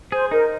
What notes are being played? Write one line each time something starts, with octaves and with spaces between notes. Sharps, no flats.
G#4 C5
D#4 A#4